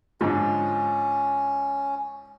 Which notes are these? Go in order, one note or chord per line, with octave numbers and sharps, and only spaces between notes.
G#2 D3 F3 C#4